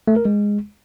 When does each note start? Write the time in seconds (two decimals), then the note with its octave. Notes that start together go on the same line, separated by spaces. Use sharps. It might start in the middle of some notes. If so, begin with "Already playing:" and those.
0.08 A3
0.16 A#4
0.25 G#3